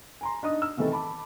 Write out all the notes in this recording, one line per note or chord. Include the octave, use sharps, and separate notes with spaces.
G#5 A#5 C6
D4 D#4 D#6
E6
C3 D#3 E3 A3 D#4 A4
A5 B5 D6